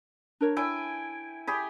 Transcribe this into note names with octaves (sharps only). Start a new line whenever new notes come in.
D4 A#4 C#5
E4 G5 G#5
G4 G#4 B5